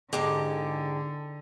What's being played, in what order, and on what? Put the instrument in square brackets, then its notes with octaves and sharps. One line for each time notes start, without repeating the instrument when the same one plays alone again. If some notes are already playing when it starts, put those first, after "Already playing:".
[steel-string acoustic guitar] E2 G#2 G#3 [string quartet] D3 [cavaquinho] G4 D6